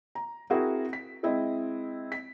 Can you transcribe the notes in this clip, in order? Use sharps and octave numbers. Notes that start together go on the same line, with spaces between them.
A#5
C4 E4 F#4 G#4 A#4
B6
G#3 C4 E4 D#5
B6